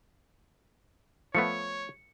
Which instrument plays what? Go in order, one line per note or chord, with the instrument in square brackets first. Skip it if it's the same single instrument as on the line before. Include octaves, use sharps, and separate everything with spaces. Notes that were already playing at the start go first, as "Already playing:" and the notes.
[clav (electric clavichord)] F3 A3 B3 [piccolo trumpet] C#5 [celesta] C#7